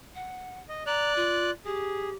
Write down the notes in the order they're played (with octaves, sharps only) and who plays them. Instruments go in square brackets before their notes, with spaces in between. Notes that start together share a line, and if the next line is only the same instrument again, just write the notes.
[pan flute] F#5
[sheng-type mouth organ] D#5
[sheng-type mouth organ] D5 F#6 [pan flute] A#5
[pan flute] F4
[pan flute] G4 [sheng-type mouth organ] G#4